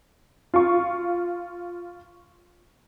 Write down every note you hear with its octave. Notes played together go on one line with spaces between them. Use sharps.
F4 C#6